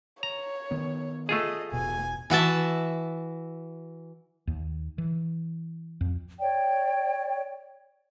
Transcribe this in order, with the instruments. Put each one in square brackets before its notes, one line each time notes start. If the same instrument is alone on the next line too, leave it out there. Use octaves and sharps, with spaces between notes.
[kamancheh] C#5 [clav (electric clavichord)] A#5
[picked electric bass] D#3 B3
[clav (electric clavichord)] A3 F4 G#4 [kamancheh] D#5
[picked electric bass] E1 B2 [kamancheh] G#5
[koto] E3 F#4 E5 A5
[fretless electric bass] D#2
E3
F2
[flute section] C#5 D5 G5